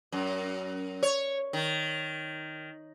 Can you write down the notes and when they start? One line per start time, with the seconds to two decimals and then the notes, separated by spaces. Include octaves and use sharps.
0.12 F#2
1.03 C#5
1.53 D#3